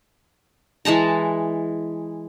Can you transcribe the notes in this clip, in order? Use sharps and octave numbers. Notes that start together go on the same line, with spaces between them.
E3 G#3 A5 A#5